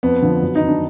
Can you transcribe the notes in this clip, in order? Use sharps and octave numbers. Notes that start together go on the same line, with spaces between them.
F2 B3
D3 F3
F#2
D#4
D#3
D4